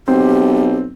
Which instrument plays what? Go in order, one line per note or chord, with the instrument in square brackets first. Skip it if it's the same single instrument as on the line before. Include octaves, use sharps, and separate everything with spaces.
[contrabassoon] B1 [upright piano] C4 [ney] G4